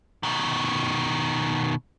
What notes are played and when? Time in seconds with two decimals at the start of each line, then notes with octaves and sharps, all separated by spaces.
0.23 B2 D#3